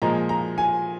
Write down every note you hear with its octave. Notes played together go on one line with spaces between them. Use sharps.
A#2 F3 G#3 A#5
A#5
G#5